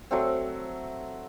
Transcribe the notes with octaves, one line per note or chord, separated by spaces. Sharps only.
F#3 A3 C4